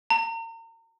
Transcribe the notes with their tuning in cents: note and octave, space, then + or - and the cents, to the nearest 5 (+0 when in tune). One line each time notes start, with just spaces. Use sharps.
A#5 -40